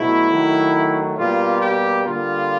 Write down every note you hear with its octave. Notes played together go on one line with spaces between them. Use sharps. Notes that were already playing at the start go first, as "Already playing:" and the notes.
Already playing: B2 F#3 A3 E4
D#3 F#3 A3
B2 G3 A#3 F4
G4
D3 G3 A#3 F4